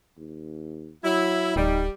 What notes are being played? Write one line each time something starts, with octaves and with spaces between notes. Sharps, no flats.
D#2
F#3 E4
D1 G3 D#4